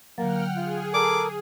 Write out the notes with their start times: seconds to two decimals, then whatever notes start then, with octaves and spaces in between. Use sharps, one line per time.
0.18 D3 F#3 A#3 F#5 G5 F6
0.56 F4 G#4
0.94 A4 A#4 D6